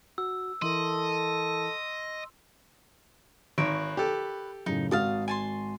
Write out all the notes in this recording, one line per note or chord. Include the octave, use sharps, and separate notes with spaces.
F#4 E6
E3 E4 A4 A#4 D#5 C6
G#1 A#4 B4 C#5
G4 A4
F#2 A2 C#3 D#4
G#1 F#4 F5 A5 D#6
G#5 A5 C6